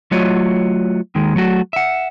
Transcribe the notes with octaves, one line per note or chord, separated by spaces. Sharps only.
F#3 A3 F4 F#4 C#5 D#5
D#2 D#3 G#3
F#3 A3 F#4
E5 F#5